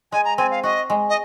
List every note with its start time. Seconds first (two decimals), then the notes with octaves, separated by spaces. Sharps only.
0.12 G#3 G#5
0.25 A#5
0.38 C4 G#5
0.51 F5
0.63 F#4 D#5
0.90 G#3
1.09 D#5